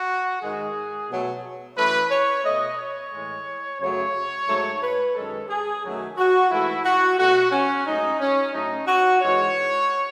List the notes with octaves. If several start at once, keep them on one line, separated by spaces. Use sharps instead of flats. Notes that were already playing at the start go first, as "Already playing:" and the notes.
Already playing: F#4
G#2 D#3 G#3 G#4
B2 F#3 A3
F#2 E3 A3 B4
C#5
B2 A3 D#5
C#5
A2 E3 G#3
F#2 C#3 F#3 A3 C#5
G#2 F#3 A3
B4
F#2 D#3 G#3 A4
G#4
F#2 D#3 F#3 A3
F#4
G#2 E3 A3 E4
F#4
B2 A3 F#4
C#4
G#2 F#3 A3 D#4
C#4
A2 F#3 A3 D#4
F#4
G#2 E3 G#3 C#5